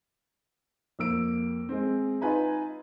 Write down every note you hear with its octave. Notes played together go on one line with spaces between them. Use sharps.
F2 A#3 E6 D7
G#3 C4
D#4 F4 B4 G#5 A#5